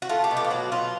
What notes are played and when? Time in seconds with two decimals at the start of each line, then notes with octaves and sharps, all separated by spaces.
0.02 F#4
0.09 A3 F4
0.24 G4
0.31 B2
0.37 G4
0.44 F4
0.50 F#3 F#4
0.72 B2 F4